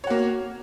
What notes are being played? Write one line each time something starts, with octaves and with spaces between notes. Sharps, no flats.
A#3 F#4 C#5